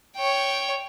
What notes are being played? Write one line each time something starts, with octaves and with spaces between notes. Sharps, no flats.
C#5 G5